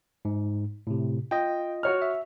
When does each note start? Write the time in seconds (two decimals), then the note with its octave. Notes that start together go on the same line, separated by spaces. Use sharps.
0.25 G#2
0.87 A2 C3
1.31 F4 D#5 G5
1.83 F#4 C#5 F6
2.02 E5